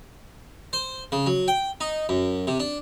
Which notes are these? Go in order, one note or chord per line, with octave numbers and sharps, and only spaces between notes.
C5
C#3
F#3
G5
D#4
F#2
C3
D4